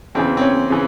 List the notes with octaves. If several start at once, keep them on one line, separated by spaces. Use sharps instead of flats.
E2 C#3 E3 C4
C4
C#4
C#3 E3